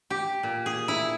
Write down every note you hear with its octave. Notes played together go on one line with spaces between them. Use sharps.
G4
A#2
G#4
E4